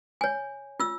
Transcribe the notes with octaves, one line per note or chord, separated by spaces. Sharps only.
C#5 G#5
F4 E6